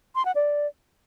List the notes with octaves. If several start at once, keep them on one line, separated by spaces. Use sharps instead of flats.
C6
F#5
D5